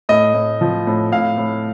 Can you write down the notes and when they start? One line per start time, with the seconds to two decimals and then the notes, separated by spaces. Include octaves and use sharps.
0.09 A2 D#5
0.34 A2
0.61 F3
0.87 A2
1.12 A2 F5
1.38 A2